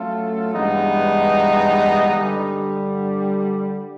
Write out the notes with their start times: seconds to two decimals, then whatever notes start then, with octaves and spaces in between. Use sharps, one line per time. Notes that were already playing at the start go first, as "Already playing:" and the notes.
Already playing: F#3 A3 C#4 F4 A4
0.53 G2 E3 G#3 B3 D#4
2.16 G2 D3 G3